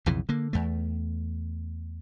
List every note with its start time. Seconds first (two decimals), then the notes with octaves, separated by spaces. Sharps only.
0.06 B1 F2 C#3 E3
0.29 D3 A#3
0.53 E2 A3